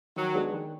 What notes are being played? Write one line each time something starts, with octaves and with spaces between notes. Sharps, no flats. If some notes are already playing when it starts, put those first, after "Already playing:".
D#3 F#3
G#3 B3 D4 G#4
D#3